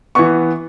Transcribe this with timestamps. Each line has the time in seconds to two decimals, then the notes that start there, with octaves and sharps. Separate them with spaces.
0.15 E3 B3 C#6